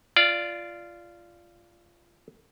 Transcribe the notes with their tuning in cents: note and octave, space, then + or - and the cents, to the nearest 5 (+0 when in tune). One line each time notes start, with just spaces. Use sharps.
F4 -15 D5 +0